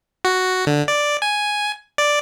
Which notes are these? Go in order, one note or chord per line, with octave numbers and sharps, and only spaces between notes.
F#4
D3
D5
G#5
D5